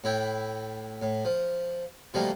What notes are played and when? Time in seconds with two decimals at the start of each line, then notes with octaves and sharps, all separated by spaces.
0.04 A2 E4 G5
1.02 A2
1.25 F3
2.14 B2 E3 F3 G3 A3 A#3